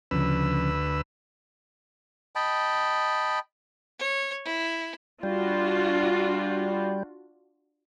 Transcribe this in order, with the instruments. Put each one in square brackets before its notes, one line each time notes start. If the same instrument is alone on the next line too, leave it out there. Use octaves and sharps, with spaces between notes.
[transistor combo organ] D2 B4 E6 [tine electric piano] C#3 F3 C#4
[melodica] D#5 G5 A5 B5
[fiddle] C#5
E4
[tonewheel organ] G3 [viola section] D4 F4 F#4